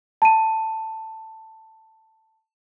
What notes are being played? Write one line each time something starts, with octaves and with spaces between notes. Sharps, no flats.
A5 D#7